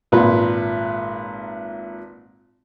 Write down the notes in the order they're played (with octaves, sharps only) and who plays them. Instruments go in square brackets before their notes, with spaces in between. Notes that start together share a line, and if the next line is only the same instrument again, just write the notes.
[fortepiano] G#1 A#2 B4